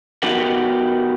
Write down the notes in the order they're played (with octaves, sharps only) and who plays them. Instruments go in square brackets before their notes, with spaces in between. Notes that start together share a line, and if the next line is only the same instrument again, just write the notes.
[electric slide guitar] B3 D#4 F#4 G4 A#4 F#5